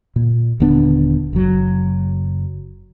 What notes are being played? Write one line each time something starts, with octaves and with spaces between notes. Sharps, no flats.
A#2
D#1 D3 B3 D4
F#1 F#3